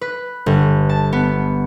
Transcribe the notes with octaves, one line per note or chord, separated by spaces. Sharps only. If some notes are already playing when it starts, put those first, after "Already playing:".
B4
G1
A5
B3